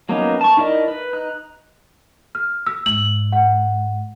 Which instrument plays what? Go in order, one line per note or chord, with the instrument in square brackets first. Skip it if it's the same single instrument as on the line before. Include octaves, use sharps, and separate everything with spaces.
[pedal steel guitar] F#3 A#3 B3 C#4 D#4
A5 C#6
D#4 E4 A#4 D5 D#5
B4
D#4 F#6
[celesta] F6
E6
[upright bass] G#2 [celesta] F#7
[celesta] F#5